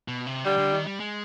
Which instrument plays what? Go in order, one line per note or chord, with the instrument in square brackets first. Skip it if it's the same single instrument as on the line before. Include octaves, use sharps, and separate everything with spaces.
[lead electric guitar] B2
C3
[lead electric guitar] D3 [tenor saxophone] G3
[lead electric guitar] D3
D#3
G3
G#3